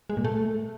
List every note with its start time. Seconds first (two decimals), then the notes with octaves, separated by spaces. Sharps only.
0.10 G#3
0.17 A#2
0.25 A3